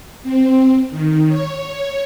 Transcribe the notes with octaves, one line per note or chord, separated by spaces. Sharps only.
C4
D#3
C#5